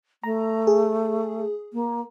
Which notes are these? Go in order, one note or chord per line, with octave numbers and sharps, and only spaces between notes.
A3 A#5
G#4
A#3